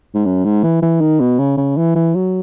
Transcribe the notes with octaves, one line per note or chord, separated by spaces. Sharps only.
G#2
F#2
G#2
E3
E3
D#3
B2
C#3
C#3
E3
E3
F#3